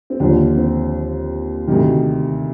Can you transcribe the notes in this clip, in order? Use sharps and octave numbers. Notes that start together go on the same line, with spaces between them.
C4
D#2 D3 F3 D4
C4
D2 C3 D#3